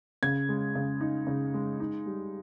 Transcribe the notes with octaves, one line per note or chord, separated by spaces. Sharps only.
C#3 G#6
G#3
C#3
D#4
C#3
G#3
D#4
G3